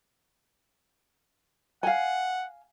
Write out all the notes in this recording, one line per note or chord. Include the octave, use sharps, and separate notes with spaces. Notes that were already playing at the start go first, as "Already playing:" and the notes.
F5 F#5 G#5